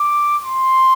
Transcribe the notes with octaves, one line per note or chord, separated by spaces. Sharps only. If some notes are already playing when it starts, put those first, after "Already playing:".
Already playing: D6
C6